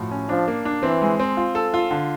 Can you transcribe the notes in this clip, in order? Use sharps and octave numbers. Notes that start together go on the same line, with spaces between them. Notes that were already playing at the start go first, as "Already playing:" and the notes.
Already playing: A2 F3 F#4
C#4
F3 D4
A#3
D4
E3 C4
G#3
C4
F4
A4
F4
D3